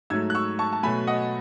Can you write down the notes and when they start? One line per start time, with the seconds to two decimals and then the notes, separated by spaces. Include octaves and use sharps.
0.10 G#2 F#3 A3 E6 G#6
0.30 F#6
0.35 C#6 E6
0.59 A5 C#6
0.73 A5
0.83 B2 F#3 A3 G#5 B5
1.07 D#5 F#5